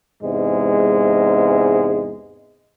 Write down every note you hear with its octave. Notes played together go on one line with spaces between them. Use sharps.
E2 G#2 C3 G#3